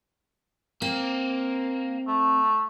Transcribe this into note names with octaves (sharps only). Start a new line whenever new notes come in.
A#3 C4
A3